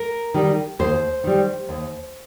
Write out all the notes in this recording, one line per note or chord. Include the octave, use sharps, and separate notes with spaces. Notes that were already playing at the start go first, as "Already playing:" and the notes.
Already playing: A#4
D#3 G3
D#2 C5
D#3 G3
D#2